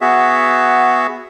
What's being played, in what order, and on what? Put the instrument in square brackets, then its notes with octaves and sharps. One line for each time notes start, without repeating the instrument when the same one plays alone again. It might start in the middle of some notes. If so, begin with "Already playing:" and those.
[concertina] B3 F#4 G#4 E5